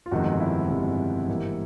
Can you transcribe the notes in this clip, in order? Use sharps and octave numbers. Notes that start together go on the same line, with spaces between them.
F4
G1 F2 C3 D#3 G#3 F#4
E4
G1 F2 C3 D#3 G#3
G#1 G#2 E3 G3 A#3